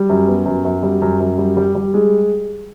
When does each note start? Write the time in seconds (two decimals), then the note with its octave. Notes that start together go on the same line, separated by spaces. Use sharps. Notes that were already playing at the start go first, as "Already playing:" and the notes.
Already playing: G3
0.10 F#2
0.28 B3
0.46 F#2
0.65 F#2
0.83 G3
1.02 F#2
1.20 F#2
1.38 G3
1.57 G3
1.75 G3
1.94 G#3